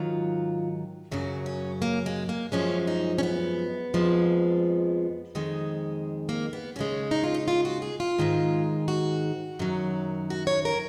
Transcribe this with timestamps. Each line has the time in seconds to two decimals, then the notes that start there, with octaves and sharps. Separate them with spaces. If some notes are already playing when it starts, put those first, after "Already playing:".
Already playing: G#2 D#3 F#3 F4
1.12 F#2 C#3 F#3 F#4
1.46 C#4
1.82 A#3
2.06 G#3
2.29 A#3
2.52 F#2 F3 G#3 C#4
2.87 D#4
3.18 C#4
3.23 B3
3.94 F2 F3 G#3
5.35 F2 D#3 G#3
6.29 A#3
6.53 B3
6.76 D#2 C#3 G#3 C#4
7.11 D#4
7.23 F4
7.34 D#4
7.48 F4
7.65 F#4
7.82 G#4
8.00 F4
8.18 G#2 D#3 G#3
8.88 F#4
9.59 F#2 D#3 F#3
10.30 F#4
10.47 C#5
10.65 A#4